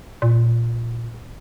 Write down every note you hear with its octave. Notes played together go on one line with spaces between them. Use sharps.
A#2